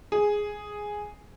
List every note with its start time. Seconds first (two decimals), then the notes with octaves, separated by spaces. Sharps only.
0.12 G#4